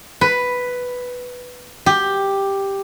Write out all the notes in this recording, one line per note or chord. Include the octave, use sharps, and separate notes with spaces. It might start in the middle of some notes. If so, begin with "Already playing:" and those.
B4
G4